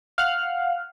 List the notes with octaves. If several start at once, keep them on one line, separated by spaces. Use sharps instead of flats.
F5 F#5 F6 F#6